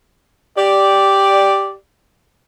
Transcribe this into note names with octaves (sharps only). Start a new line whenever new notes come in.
G4 D5